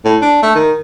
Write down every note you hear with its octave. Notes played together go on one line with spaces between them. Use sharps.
A2
D4
A3
D#3